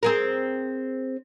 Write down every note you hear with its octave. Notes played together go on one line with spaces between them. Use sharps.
C4 G#4 A#4